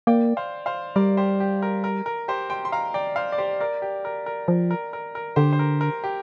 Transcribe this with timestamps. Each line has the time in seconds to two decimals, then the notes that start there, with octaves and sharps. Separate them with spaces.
0.07 A#3 D5 G5
0.37 C5 F5
0.66 C5 F5
0.96 G3 A#4 D5
1.17 G4 C5
1.40 G4
1.62 A#4
1.84 A#4
2.06 A#4
2.28 G4 C5
2.50 G5 C6
2.65 C6
2.72 F5 A#5
2.94 D5 G5
3.16 C5 F5
3.32 D5
3.38 G4 C5
3.60 A#4 D5
3.82 G4
4.05 A#4
4.26 A#4
4.48 F3 A#4
4.71 A#4
4.93 A#4
5.15 A#4
5.36 D3 G4 C5
5.53 C5
5.59 A#4
5.81 A#4
6.03 G4